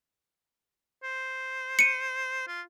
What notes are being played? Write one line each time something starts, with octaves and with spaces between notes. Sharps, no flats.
C5
C#7 D#7
F4